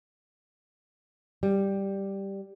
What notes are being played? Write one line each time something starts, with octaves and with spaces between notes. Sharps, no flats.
G3